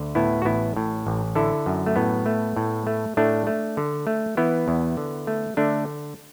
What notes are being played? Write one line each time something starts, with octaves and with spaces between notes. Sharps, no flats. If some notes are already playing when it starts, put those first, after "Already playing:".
Already playing: D2 D3
A2 B3 E4
F#4
A1 B3 E4
A2
A1
D3 E4 A4
F#2
A3
A2 B3
A3
A2
A3
A2 A3 D4
A3
D3
A3
E3 B3 E4
E2
D3
A3
D3 A3 D4